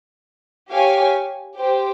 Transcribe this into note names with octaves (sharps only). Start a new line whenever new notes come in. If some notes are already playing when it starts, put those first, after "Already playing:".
G4 C#5 F5 G#5
G4 C5 G5